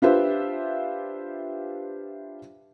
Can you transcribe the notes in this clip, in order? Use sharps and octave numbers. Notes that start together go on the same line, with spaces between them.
D4 F4 G4 B4 C5 E5